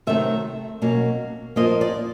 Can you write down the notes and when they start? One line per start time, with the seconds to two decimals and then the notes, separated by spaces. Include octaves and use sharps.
0.07 C3 D#3 F#3 A3 E5
0.82 B2 F#3 A#3 C#4
1.56 A#2 F3 A#3 D#5
1.81 D5